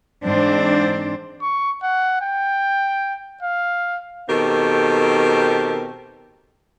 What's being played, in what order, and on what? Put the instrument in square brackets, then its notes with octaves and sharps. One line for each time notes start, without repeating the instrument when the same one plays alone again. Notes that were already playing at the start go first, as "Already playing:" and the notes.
[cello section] G#2 E3 C4 D4 C5
[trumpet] C#6
F#5
G5
F5
[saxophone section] B2 D#3 C4 G4 A4 A#4